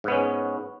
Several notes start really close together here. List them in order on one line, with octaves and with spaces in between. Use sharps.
G#2 B3 C#4